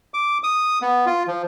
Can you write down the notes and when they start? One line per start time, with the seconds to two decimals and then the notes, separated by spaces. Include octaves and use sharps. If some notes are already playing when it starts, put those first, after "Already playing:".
0.14 D6
0.44 D#6
0.82 B3
1.06 F4
1.27 F3